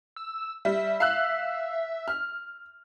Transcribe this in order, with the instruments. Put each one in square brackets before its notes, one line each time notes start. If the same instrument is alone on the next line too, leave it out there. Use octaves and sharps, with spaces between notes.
[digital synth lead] E6
[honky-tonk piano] G3 [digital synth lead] E5
[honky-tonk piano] F5 E6 F#6
F6